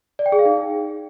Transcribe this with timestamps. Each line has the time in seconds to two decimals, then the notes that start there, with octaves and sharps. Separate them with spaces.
0.19 D5
0.26 G5
0.32 G#4
0.39 F5
0.46 D#4